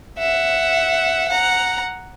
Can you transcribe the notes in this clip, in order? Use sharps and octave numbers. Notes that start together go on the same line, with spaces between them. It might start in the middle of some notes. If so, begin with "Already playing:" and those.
E5 F#5
F#5 A#5